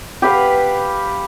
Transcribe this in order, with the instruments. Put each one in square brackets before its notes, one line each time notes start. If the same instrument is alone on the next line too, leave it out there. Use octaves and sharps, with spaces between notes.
[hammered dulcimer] G4 B4 F5